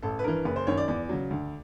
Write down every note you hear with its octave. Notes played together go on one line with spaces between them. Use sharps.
A1 A4
B4
G2 E3 A#4
F#1 B4
C5
F#2 D#3 C#5
D5
E2 D5
C#3 F#3
D2